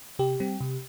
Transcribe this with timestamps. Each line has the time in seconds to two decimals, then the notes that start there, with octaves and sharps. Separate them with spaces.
0.19 C3 G4
0.40 G3 C4
0.61 C3